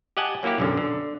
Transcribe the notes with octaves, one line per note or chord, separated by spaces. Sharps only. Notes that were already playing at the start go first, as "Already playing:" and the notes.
G4 D#5 F#5 G#5 A5
F#3 A#3 E4 F#4 G4
B1 F#2 D3
D3